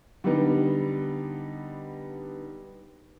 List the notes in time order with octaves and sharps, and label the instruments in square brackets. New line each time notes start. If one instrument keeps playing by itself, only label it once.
[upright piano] D3 G3 B3 D#4